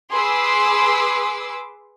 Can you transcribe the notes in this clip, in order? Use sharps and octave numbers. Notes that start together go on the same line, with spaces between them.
G#4 B4 C6 D6 E6